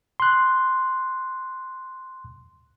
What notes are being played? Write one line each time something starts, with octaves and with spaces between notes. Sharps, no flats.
C6 F#6